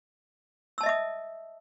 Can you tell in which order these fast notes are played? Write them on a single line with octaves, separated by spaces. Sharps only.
E6 A5 D#5 E5 D#6